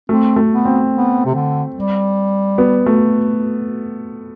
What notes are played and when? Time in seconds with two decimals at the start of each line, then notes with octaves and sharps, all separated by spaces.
0.09 A3 C4
0.36 A3
0.51 B3
0.65 C4
0.93 B3
1.25 C3
1.34 D3
1.75 G3
2.58 B3
2.86 A3